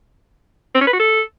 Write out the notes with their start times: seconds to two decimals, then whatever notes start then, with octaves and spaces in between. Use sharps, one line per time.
0.75 C4
0.81 C#4
0.87 B4
0.93 F#4
0.99 A4